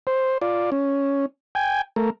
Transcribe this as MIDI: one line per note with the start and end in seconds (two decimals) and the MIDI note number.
0.07 0.38 72
0.41 0.70 65
0.41 0.70 74
0.72 1.26 61
1.55 1.82 79
1.55 1.82 80
1.96 2.10 57
1.96 2.10 70